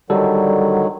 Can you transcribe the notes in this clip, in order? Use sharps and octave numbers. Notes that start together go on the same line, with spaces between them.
D3 D#3 F#3 G3 A4